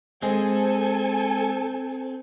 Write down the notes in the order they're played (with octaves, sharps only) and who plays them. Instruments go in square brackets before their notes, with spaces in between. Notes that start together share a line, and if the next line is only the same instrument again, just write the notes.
[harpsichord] G#3 [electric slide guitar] C4 [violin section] A4 G#5